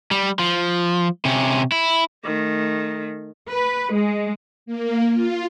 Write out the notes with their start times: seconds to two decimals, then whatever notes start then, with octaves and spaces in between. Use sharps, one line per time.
0.11 G3
0.39 F3
1.25 C3 C#4
1.72 E4
2.24 D#3 A3
3.51 B4
3.93 G#3
4.66 A#3
5.10 F4